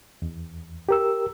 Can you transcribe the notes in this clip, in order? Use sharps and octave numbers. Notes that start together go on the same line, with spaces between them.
E2
G4 A#4 E6